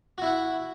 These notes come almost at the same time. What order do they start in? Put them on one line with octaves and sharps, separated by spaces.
F#4 E4 F#5